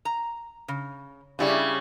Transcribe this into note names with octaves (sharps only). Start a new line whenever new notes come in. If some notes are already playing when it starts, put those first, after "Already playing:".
A#5
C#3
C#3 G3 D4 E4 C#5